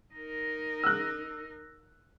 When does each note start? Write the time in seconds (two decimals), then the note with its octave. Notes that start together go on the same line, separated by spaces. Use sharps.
0.14 D#4 A#4
0.83 E6 F#6